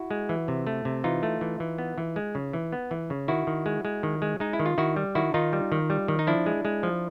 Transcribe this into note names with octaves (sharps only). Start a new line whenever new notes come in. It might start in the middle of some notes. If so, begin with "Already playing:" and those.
Already playing: E4 F#4
G#3
E3
C3
A3
C3
E3 D#4 F4
A3
E3
E3
B3
E3
G#3
C#3
E3
B3
E3
C#3
D#3 E4 F#4
D#3
G#3
G#3
D#3
G#3
G#3 D#4
E4
D#3
F4
D#3 E4 F#4
G3
D#3 E4 F#4
D#3 D#4 F4
G3
D#3
G3
D#3
D#4
F3 D4 E4
G#3
G#3
F3